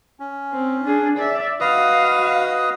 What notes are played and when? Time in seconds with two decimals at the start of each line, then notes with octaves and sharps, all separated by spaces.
0.20 C#4
0.52 C4
0.84 D4 G#4
1.18 D5 E5
1.60 F#4 B4 D#5 F5 D#6